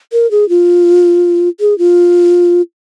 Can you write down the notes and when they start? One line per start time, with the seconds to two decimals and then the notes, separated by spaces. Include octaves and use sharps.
0.12 A#4
0.31 G#4
0.49 F4
1.60 G#4
1.78 F4